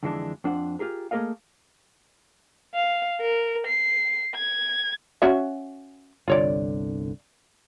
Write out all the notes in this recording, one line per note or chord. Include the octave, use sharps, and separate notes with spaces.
F2 D3 E3 G#3 C4 D4
F2 D4 C5 F#5
F4 G4 G#4 A#4
A3 A#3 G#4 A#4 D#5 F5
F5
A#4
C7
G#6
C#4 F#4 E5
G1 C2 D3 F4 C#5 D5